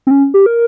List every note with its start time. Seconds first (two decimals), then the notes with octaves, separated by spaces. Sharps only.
0.07 C4
0.11 C#4
0.34 G4
0.46 A#4